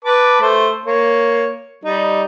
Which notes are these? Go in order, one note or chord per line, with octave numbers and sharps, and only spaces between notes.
B4 A5 D6
A3 C5
A#3 C#5
G3 D#4